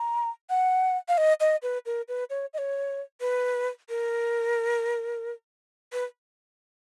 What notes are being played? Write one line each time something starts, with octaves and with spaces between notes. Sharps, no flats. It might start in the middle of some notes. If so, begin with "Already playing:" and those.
Already playing: A#5
F#5
F5
D#5
D#5
B4
A#4
B4
C#5
D#5
C#5
B4
A#4
B4